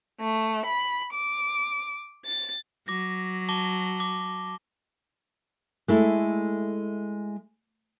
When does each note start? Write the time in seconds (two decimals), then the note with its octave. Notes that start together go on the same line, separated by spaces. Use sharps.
0.20 A3
0.66 B5
1.13 D6
2.25 A6
2.88 F#3 D6 A#6
3.49 A5 D6 G7
4.00 D6
5.88 G#3 A3 E4